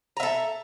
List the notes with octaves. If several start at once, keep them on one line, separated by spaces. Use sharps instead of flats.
A4 E5 A#5